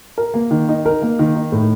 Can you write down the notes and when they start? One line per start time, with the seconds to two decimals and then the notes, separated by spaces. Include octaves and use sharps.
0.18 A#4
0.34 A#3
0.51 D#3
0.69 D#4
0.86 A#4
1.02 A#3
1.19 D#3
1.35 D#4
1.52 A2